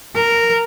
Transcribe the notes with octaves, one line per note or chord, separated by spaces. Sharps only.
A#4